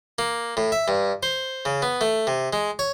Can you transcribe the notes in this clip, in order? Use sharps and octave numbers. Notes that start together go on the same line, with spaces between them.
A#3
A2
E5
G2
C5
C#3
B3
A3
C3
G#3
C#5